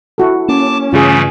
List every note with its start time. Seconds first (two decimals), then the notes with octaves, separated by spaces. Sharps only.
0.18 E4 F#4 A4
0.48 A#3 C#4 A5 D6
0.93 G2 C#3 E3 G3 A3 F4 G#4